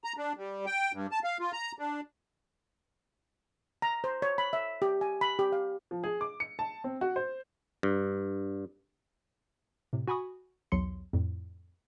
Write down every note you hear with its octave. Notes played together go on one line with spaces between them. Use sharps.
A#5
D4
G3
G5
G2
A5
F5
F4
A#5
D4
A#5
C5
C#5
B5
E5
G4
G#5
B5
G4
F5
F3
G#4
D6
C#7
A5
C4
F#4
C5
G2
A2 C3
F#4 G#5 B5 C#6 D#6
B1 E2 F#3 C6 C#7
F2 A2